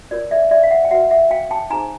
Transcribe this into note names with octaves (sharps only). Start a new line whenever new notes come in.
F4 A#4 C#5 D5
D5 E5
D5 E5
F5
E5 F#5
G5
F#4 B4 E5 F#5
E5 F#5
F5 G5
G5 A5
D#4 G#4 C5 G#5 A#5